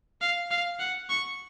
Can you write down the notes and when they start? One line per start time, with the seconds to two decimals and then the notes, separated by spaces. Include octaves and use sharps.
0.21 F5
0.51 F5
0.79 F#5
1.09 C#6